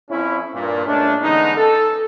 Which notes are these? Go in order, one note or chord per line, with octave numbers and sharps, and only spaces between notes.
F2 C#4 E4
G2 A#2
A#2 G#3 A3 C#4 D4
D3 E3 G#3 B3 C#4 D#4
A4